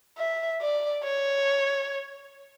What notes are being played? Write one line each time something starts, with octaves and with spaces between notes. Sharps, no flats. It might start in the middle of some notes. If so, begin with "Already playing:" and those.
E5
D5
C#5